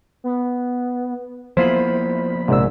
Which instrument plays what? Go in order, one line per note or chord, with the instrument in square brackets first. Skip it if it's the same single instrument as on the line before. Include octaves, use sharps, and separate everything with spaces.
[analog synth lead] B3
[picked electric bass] F3 A#3 B3 [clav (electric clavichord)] E4 F4 G#4 [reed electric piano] C5 [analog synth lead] B5
[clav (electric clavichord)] A#1 G#2 [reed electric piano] C3 D4 E6 [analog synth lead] G#3